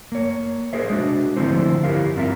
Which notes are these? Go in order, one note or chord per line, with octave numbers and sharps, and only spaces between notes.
A#3 C#5
G#4 A#4 C5 E5
G#3 D4 F#4
D3 F3 A3 C4 E4 C5
E4 F4 G4 A#4 F5
G2 C4 F4 A#4 E5